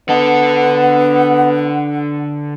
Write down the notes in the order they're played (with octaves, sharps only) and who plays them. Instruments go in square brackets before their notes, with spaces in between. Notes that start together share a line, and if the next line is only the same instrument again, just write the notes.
[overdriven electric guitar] D3 A4 [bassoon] B3 [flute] F#5